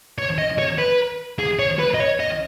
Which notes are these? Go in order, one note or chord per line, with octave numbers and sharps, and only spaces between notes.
C#5
D#5
C#5
B4
G#4
C#5
B4
D#5
C#5
D#5